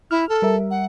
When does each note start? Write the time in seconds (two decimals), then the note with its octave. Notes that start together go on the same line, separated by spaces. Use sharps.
0.11 E4 F6
0.29 A4
0.42 G3 A#4 E5
0.71 F#5